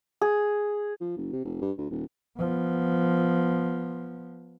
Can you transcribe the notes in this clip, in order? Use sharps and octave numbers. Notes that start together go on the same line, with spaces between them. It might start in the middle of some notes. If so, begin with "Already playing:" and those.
G#4
F3
F#1
C3
F1
G2
D2
D#1
F3 B3